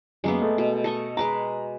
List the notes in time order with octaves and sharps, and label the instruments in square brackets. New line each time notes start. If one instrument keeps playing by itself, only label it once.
[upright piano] F#2 [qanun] G#3 A#3 B3
[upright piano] A3
[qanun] B2
A4 D#5 C#6
[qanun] G#3 B4 D6 [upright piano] A#5